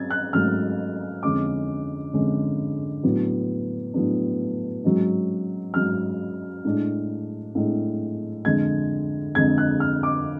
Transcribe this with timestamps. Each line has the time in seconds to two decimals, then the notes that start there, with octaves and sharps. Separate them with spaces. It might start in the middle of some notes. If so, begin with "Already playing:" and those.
Already playing: F#3 C#4 G#6 A6
0.10 F#6
0.33 G#2 F#3 A3 C#4 F6
1.23 F2 D3 G#3 C#4 D6
2.13 F2 D3 G#3 C#4
3.03 A2 F#3 B3 D4
3.94 A2 F#3 B3 D4
4.84 G#2 F#3 C#4
5.74 G#2 F#3 C#4 F6
6.65 A2 G#3 D4
7.55 A2 G#3 D4
8.45 F2 D3 G#3 D4 G#6
9.35 F2 D3 G#3 D4 G#6
9.58 F#6
9.80 F6
10.03 D6